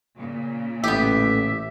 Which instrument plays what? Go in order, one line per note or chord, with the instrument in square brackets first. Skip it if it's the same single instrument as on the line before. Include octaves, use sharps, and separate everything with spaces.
[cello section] A#2 C#3
[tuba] A1 [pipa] B3 G4 [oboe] E5